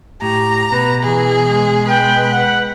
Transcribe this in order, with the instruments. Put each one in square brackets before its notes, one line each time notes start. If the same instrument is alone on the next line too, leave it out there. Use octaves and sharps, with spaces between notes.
[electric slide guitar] A2 [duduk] G4 [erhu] A#5
[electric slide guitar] B2 [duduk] B4
[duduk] E3 [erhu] G#4
[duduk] G#3
[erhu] B4 [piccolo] G5
[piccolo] F#5